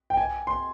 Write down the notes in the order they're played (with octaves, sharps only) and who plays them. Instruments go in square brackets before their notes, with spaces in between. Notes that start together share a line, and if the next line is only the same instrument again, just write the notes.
[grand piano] G5
G#5
C6